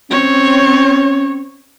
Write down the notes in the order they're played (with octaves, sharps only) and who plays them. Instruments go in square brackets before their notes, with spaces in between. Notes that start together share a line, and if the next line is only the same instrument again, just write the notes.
[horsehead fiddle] C4 C#5 [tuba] C#4